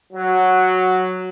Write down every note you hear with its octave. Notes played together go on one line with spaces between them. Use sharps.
F#3